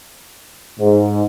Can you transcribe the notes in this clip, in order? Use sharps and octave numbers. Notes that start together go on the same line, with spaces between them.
G#2